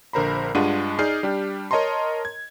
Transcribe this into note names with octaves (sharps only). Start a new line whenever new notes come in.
A#1 D3 A#4 C5 A#5 B5
G2 G#3 D4 F4 F#5 D#7
D#4 G#4 D5 F6 G6 C7
G3 D4 G4
A#4 C#5 D#5 A5 A#5 C6
G#6